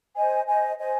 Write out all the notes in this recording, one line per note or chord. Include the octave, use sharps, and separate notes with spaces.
C5 D#5 G#5
C5 D#5 G#5
C5 D#5 G#5